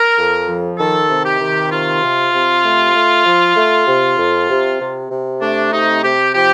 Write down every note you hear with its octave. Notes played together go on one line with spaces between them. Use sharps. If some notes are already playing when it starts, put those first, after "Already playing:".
Already playing: A#4
F2
F3
D#3 A4
C3
G4
D#3
C3 F4
C3
C3
A3
A3
F3
A3
C3
F2
C3
C3
C3
A3 D4
C3 D#4
C3 G4
F3 G4